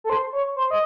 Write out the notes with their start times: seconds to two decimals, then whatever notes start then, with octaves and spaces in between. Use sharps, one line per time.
0.04 A4
0.10 C5
0.33 C#5
0.56 C5
0.71 D#5